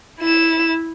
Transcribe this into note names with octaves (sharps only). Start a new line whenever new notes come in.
E4 E7